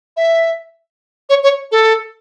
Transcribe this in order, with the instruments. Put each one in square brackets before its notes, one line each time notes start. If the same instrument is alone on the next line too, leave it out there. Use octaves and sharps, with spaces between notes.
[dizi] E5
C#5
C#5
A4